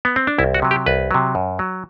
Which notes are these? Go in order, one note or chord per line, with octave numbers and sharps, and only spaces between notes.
B3
C4
D4
C2 E4
F#4
C3 F#3
G4
C2 B4
C3 F#3
F#2
F#3